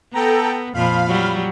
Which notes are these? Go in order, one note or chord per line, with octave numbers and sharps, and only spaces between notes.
B3 A4 G5 A#5
F2 A#2 F3 F5 B5 F6
F#3 G3